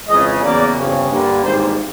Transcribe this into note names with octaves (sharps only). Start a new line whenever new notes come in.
F2 C#3 E3 G#3 D#5
E2 C#3 F#3 A#3 D5
G1 F2 C#3
G2 D3 G3 A#3
G#1 G#2 E3 G3 A#3 C5